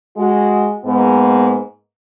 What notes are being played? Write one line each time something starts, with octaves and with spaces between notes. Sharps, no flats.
G#3 F#4
G#2 A#3 B3